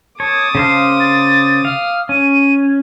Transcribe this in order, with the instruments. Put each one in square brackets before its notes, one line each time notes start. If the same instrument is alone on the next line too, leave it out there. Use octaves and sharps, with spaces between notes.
[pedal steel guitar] C#5 [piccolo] A5 [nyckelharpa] D6 D#6
[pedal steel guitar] C#3 C5 F5
[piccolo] A6
[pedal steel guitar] F5 [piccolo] F6
[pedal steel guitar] C#4 [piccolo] D#7